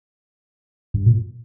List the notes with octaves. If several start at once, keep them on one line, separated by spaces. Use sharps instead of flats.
G2
A#2